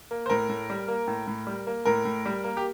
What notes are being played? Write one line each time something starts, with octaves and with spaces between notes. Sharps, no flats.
A#3
C5
A2 A#4
A2
G3
A#3
A2
A2
G3
A#3
A2 A#4
A2
G3
A#3
G4